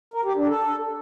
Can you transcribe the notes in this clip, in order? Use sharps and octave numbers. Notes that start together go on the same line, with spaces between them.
A#4
G4
D4
A4